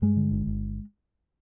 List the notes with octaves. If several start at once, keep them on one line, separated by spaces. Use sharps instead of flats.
G2 G#3
D3
G1
G1